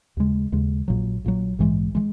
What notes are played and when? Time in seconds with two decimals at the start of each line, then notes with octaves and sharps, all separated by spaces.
0.17 D#2 C#3 G#3
0.52 D#2 C#3 G#3
0.88 A#1 A#2 F#3
1.24 A#1 A#2 F#3
1.59 A#1 G#2 E3 G#3
1.95 E3 G#3